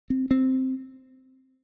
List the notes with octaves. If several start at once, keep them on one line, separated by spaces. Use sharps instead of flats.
C4
C4